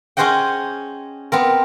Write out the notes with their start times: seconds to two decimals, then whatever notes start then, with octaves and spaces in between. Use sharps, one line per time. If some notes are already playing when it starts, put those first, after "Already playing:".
0.17 C#4 G#4 C5 D#5 F#5 G5
1.32 B3 C4 A#4